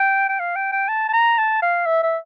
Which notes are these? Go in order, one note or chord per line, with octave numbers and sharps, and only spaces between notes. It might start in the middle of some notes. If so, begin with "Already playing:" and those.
Already playing: G5
G5
F5
G5
G5
A5
A5
A#5
A5
F5
E5
E5